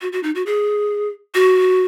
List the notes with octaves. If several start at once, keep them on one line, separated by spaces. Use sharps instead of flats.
F#4
F#4
D#4
F#4
G#4
F#4